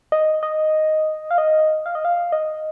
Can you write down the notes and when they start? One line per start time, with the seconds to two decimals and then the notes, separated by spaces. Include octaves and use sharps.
0.12 D#5
0.43 D#5
1.31 F5
1.38 D#5
1.86 F5
1.95 D#5
2.05 F5
2.32 D#5